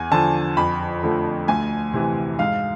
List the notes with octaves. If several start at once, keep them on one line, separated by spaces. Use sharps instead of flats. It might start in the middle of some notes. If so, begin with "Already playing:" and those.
Already playing: E2 G#5
D3 F3 A5
F2 B5
D3 F3 A3
D2 G#5
C3 E3
G#2 F5